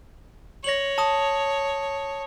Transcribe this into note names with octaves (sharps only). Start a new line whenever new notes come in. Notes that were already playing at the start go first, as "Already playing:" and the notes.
C#5 A#6 F#7
A5 D#6